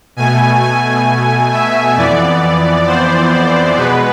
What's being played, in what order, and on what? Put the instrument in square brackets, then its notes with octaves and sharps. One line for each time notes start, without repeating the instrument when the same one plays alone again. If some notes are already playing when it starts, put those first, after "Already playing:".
[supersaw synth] B2 A3 G#5
G#5
E5
F2 E3 B3 D5
C5
B2 G#3 B3 B4